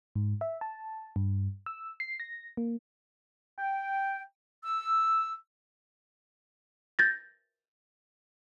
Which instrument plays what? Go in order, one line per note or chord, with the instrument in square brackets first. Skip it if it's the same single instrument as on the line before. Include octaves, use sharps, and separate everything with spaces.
[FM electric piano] G#2
E5
A5
G2
E6
C7
A#6
A#3
[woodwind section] G5
E6
[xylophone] G6 A6 A#6